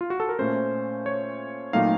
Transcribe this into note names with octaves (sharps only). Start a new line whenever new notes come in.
F4
F#4
A4
A#4
A#2 A3 C#4 C5
C#5
A#2 F#3 A3 C4 D#4 F5